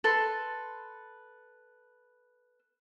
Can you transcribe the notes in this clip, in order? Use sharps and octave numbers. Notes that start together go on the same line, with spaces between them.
A4 B4 C6